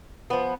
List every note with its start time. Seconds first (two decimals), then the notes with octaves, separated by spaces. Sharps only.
0.30 F3 B3